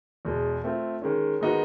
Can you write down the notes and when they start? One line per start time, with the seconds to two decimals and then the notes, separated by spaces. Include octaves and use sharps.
0.25 E2 B2 G#3
0.64 A3 C4 F4
1.02 D#3 G#3 C#4
1.41 D#3 G#3 B3 D#4 F#4